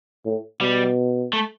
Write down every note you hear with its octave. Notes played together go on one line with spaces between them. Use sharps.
A2
B2 G3
A3